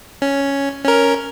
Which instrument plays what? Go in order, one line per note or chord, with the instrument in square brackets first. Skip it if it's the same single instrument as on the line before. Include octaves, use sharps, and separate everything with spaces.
[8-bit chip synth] C#4
C#4 A#4